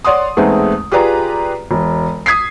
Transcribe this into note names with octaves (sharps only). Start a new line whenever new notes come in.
C#5 D5 F#5 C6 D#6
E2 G#3 A3 B3 C4 D#4
F4 G4 G#4 B4 D5 A#5
E1
D#6 G#6 B6 C7